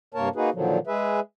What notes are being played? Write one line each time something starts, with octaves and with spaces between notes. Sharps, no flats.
G2 C3 A#3 A#4 C#5 A5
A#3 D#4 F#4 G#4 B4
A#2 D3 D#3 F3 F#3
G#3 G#4 B4 E5